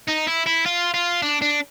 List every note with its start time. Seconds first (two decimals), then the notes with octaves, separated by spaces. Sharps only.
0.08 D#4
0.27 E4
0.46 E4
0.66 F4
0.94 F4
1.22 D4
1.42 D4